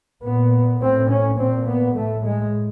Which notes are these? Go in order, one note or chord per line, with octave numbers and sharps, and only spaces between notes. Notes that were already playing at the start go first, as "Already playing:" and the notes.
A#2 B3
A2 C4
C#4
A#2 C4
B3
A2 A3
G#3